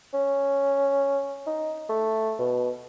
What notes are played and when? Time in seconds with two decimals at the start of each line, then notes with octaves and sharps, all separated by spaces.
0.13 C#4
1.46 D#4
1.89 A3
2.38 B2